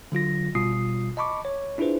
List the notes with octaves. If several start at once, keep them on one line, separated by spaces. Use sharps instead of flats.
D3 F#3 F4 A#6
G1 B2 G3 F4 D#6 C7
D#5 A5 B5 C#6 D6
C#5
D4 E4 F4 G#4 B4 C5